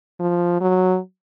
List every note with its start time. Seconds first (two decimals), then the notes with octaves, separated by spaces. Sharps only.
0.20 F3
0.61 F#3